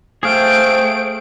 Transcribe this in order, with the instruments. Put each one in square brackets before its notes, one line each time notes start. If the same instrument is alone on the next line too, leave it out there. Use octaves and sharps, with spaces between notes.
[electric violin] A3 D7 [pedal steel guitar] G#4 F5 G5 [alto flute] C5